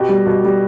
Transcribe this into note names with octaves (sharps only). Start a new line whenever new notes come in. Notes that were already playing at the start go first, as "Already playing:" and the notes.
Already playing: B2 G4
G3
B2
G3